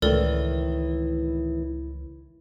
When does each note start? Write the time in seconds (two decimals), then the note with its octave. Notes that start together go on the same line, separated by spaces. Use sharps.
0.02 C#2 A2 D#3 E3 A4 A#4 D5